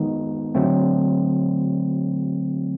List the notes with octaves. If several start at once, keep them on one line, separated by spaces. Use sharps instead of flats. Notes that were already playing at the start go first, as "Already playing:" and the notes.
Already playing: D#3 G#3 B3 D#4
D3 F#3 A3 C4